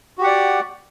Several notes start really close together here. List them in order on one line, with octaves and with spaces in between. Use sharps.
F#4 G4 F#5 D5